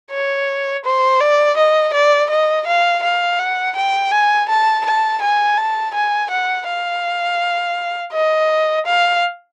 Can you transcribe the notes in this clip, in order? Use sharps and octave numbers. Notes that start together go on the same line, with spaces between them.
C#5
C5
D5
D#5
D5
D#5
F5
F5
F#5
G5
G#5
A5
A5
G#5
A5
G#5
F#5
F5
D#5
F5